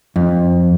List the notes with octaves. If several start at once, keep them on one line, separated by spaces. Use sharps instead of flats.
F2